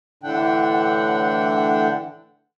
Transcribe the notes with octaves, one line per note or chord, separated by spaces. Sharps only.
A2 D3 E3 D4 F#5 G5